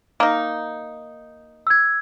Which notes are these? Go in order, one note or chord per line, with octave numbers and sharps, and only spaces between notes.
A#3 D#4
E6 G#6